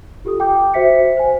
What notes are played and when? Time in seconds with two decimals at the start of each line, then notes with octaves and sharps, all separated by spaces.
0.25 F4 G4 A4 D#6
0.40 G5 D6 G6
0.74 F#4 C5 E5 B6 C#7
1.17 C5 G#5